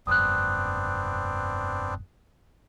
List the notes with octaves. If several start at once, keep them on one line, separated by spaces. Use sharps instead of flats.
F1 G2 B3 C4 D4 D#6 F#6